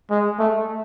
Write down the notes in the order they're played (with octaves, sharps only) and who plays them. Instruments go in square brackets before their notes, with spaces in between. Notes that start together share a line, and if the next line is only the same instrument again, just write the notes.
[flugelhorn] G#3
A3